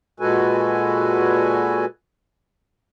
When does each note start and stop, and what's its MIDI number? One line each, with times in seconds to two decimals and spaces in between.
0.20 1.85 46
0.20 1.85 56
0.20 1.85 66
0.20 1.85 69
0.20 1.85 71
0.20 1.85 80